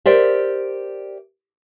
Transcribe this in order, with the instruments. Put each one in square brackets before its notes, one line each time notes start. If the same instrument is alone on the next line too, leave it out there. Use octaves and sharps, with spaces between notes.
[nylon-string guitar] G4 A#4 C5 D5 E5